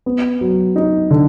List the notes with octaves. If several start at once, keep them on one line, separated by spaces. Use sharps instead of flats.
B3
F#3
D#4
D3